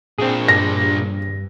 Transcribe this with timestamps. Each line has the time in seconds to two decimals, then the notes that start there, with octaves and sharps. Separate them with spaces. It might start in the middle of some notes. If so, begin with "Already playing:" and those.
0.18 A#2 C4 D4 G#4
0.48 G2 A#6